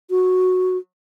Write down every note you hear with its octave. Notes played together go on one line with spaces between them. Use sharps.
F#4